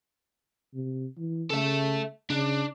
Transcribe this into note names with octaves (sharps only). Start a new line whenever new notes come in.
C3
E3
C#3 A4 E5
C#3 D4